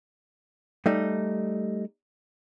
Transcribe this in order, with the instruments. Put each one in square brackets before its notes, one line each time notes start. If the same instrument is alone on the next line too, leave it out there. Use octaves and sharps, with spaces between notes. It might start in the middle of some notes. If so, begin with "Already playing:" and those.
[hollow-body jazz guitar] G3 A3 D#4